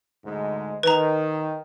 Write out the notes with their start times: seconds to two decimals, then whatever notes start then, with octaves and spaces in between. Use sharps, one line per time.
0.24 D2 G#2 G#3
0.83 D#3 B4 A#5